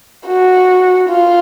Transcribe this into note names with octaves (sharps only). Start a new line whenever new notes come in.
F#4
F4